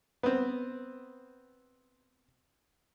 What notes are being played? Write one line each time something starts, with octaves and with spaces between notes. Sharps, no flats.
B3 C4